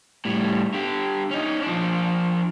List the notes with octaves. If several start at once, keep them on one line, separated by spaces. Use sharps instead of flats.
A2 G3
D3 G4
C#4 D#4
F3 D4